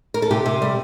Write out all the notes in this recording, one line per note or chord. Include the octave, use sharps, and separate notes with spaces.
A#4
A4
C3 G4
C3
G3